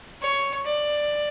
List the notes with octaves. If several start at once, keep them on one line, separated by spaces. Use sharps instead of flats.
C#5
D5